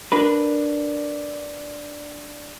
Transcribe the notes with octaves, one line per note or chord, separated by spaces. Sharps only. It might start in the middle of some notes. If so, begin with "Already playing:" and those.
D4 A#4 B4